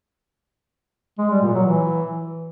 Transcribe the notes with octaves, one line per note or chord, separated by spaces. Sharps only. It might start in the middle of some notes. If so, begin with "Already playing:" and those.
G#3
G3
A#2
F#3
E3